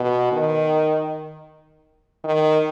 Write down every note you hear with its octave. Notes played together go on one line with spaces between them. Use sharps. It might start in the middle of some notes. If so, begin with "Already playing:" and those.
Already playing: B2
D#3
D#3